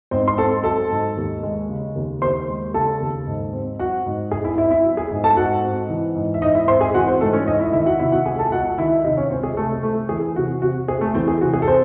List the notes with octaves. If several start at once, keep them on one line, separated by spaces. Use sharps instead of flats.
G#2 C4 C5
C6
C4 A4 A5
F#3 A4 A5
G#2
D#2
G#3
C#3
D#2
D#2 C5 C6
G#3
C#3 A4 A5
D#2
G#2
C4
F#3 F#4 F#5
G#2
G#2 G#4 G#5
E4 E5
C4 E4 E5
E4 E5
F#3
G#4 G#5
G#2
A4 A5
G#2 F#4 F#5
C4
E3
G#2
E5
G#2 D#4 D#5
E4 E5
C4 C5 C6
G#4 G#5
E3 F#4 F#5
C4 C5
G#2 A3 A4
C#4 C#5
C#2 D#4 D#5
E4 E5
D#3 E4 E5
F#4 F#5
C3 E4 E5
F#4 F#5
C#2 G#4 G#5
A4 A5
C#2 F#4 F#5
D#3 E4 E5
C3 D#4 D#5
C#4 C#5
C#2 C4 C5
G#4
C3 A3 A4
A3 C4 A4
E3 G#4
C3 F#4
C3 F#4
C4 G#4
A3 A4
E3 C4 C5
G#4
C3 F#4
G#4
A4
C4 C5